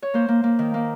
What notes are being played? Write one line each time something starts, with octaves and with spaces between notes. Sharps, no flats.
C#5
A#3 C5
A#3
A#3
D#3
A#3